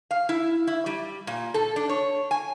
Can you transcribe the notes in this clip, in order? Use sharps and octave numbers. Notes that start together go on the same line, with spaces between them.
F5
E4
E4
G3
A#2
A4
D4
C#5
G#5